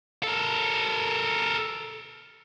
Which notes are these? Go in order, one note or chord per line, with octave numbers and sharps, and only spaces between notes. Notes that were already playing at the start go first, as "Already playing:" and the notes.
A4 A#4